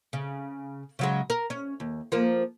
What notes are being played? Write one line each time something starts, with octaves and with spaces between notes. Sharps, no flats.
C#3
C#3 F#3 G#3
A#4
C#4
D#2
F3 A#3